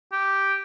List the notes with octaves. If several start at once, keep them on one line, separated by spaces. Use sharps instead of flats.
G4